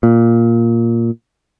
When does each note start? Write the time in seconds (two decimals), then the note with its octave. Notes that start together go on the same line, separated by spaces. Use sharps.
0.03 A#2